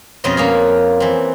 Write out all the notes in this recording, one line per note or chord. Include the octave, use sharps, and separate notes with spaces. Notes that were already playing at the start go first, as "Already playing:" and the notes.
F2 B2 G#3 C#4 F4 D#5
A#3 C#4 G#4
E3 C4